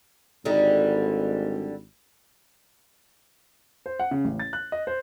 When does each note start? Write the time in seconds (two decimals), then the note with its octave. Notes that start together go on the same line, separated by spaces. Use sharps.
0.45 G#1 D3 G3 D#4
3.86 C5
3.99 F#5
4.11 C#3
4.25 A1
4.40 A6
4.53 F#6
4.72 D#5
4.87 C5